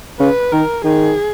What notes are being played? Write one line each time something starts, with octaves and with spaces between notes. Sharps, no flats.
C#3 B4
D#3 A#4
D#3 G#4